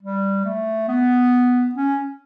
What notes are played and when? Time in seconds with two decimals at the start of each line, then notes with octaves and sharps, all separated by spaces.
0.03 G3
0.45 A3
0.88 B3
1.75 C#4